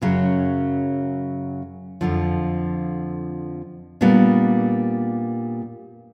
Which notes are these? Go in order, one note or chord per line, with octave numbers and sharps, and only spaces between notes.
F#2 C#3 F#3
F2 D3 F3
A#2 G3 B3 D4